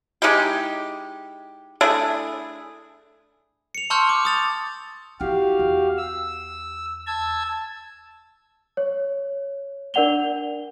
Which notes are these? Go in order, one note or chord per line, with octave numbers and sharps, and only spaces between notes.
G#3 D#4 E4 G4
A3 D4 E4 G#4
C#7 F7
A5 C6 C#6 E6 F6 G6
D6
D#6 A6 F7
E4 F#4 G4 F5
E2
E6
A5 E6 G#6
C#5
D4 A#4 D5 F#5 F7 G7